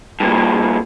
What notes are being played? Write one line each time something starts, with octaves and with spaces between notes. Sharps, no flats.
G2 A#2